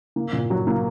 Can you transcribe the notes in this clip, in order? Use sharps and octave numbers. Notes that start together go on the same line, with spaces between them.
A#3
A#2
F#3
A#3